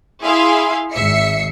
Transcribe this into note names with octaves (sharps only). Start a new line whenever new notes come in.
E4 G#4 E5 F5 C6
G#1 E5 C7 C#7